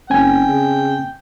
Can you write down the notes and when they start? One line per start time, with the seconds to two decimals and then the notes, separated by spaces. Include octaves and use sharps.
0.10 F#1 C4 C#4 G5 G#5
0.48 C#3